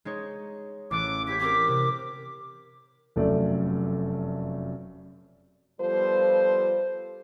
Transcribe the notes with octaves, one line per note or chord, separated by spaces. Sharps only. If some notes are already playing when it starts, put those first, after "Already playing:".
G#3 D#4 C#5
A1 A4 D6 F#6
E4 G4 C#5 B6
C4 G4 A#4 D6
C3
F1 F#2 A3 D5
F3 G3 B3 F4 A4 C5